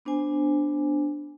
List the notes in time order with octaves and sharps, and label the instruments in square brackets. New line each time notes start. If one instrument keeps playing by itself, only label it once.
[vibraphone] B3 D4 C5 G#5